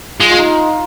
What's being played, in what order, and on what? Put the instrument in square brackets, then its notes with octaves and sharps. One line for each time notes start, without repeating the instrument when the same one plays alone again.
[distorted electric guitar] G#3 [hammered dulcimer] F4
[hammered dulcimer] F4
D#4